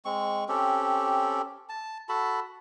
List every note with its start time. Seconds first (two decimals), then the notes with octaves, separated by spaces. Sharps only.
0.05 G#3 C4 C#6
0.48 C4 C#4 G4 A4
1.69 A5
2.09 F#4 A4 A5 B5